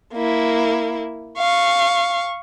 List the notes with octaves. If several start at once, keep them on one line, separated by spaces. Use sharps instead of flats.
A#3 E4
F5 C#6